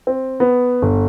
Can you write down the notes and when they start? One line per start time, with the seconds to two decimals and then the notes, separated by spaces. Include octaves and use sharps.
0.07 C4
0.40 B3
0.82 G1